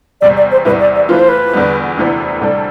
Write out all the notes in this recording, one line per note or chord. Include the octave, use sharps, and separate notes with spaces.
E2 C3 G3 D5
D5
C5
E2 C3 G3 B3 E4 B4
D5
D5
E3 A3 C4 F4 B4
C5
B4
E2 D3 G3 B3
D2 C3 E3 B3 D4
D2 C3 G3 D4 A4